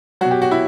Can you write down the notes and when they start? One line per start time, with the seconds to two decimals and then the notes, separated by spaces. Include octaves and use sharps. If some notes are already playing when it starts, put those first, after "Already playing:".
0.21 B2 F#3 F#4
0.31 G4
0.42 F#4
0.51 E4